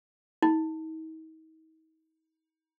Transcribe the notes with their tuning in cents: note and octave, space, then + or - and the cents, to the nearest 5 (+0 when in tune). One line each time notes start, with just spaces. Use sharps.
D#4 +40